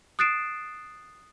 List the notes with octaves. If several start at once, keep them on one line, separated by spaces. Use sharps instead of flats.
D#6 F#6 A6 C7 D7 E7